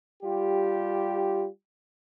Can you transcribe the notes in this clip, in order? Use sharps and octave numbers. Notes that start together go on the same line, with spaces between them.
G3 F4 G4